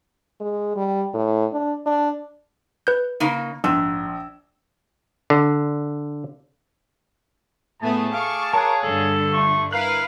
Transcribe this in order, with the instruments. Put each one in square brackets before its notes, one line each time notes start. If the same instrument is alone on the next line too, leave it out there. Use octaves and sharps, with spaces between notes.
[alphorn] G#3
G3
A2
D4
D4
[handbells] B4 G6
[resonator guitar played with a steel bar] C#3 A#3 D#4
[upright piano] A#1 E6 [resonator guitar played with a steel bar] G#2
[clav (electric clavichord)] D3
[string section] A2 A3 B3 [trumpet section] G#4 A5
[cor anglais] F5 [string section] C#6 D6
[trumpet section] G#4 C#5 F5 [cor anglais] A#4 [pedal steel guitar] A5 F#6
[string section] G2 D3 [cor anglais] A4 [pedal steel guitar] D5
[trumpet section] A3 F4 C#6
[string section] E4 B4 [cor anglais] A#4 [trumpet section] F5 [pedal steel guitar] F#6